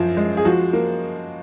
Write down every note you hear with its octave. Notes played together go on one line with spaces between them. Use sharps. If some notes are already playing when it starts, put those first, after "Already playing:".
Already playing: F#2 F3
G#3
G#4
F3 F#4
A#3